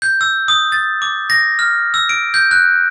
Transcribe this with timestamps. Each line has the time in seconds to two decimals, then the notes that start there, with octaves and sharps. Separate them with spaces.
0.02 G6
0.21 E6
0.48 D#6
0.72 A6
1.02 D6
1.30 A#6
1.59 F6
1.94 E6
2.09 D7
2.34 G6
2.51 F#6